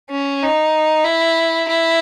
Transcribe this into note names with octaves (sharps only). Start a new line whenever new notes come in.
C#4
D#4
E4
E4